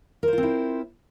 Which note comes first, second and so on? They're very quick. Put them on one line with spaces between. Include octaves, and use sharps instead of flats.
A#4 C5 F4 C4 E4